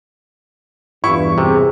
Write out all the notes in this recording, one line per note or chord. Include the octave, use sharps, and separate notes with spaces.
E2 G2 E4 F4 C#6
C3 G#4